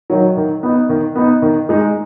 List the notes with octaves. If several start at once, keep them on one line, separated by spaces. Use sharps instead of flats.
D#3 F#3
D#3
B3 D#4
D#3
B3 D#4
D#3
G#3 D#4